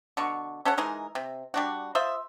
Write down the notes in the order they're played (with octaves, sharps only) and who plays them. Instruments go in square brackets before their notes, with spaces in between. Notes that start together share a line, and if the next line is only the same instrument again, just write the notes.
[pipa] B2 D3 C#6
C#4 A4 C#5 F#5
E3 G#3 D#4 A#4
C3
G3 D4 F#4
F4 C5 D#5 E5